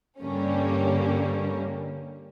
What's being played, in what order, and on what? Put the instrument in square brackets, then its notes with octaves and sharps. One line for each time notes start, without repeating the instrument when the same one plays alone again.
[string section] G2 D3 G3 A#3 C#4